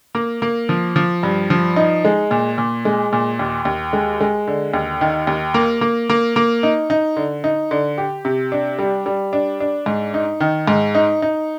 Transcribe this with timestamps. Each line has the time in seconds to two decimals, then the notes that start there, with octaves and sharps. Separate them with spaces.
0.15 A#3
0.42 A#3
0.69 F3
0.96 F3
1.23 G2
1.50 F3
1.76 D#4
2.05 G#3
2.31 A#2
2.58 A#2
2.85 G#3
3.13 A#2
3.39 D#2
3.65 D#2
3.93 G#3
4.21 G#3
4.48 D3
4.74 D#2
5.01 D#3
5.27 D#2
5.54 A#3
5.81 A#3
6.09 A#3
6.36 A#3
6.63 D#4
6.90 D#4
7.17 D3
7.44 D#4
7.71 D3
7.98 G4
8.25 C3
8.52 D4
8.79 G3
9.06 G3
9.33 D4
9.60 D4
9.86 G#2
10.14 D#4
10.40 D#3
10.68 G#2
10.95 D#4
11.22 D#4